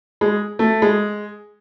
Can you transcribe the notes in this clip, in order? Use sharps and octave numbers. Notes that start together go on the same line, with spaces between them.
G#3
A3
G#3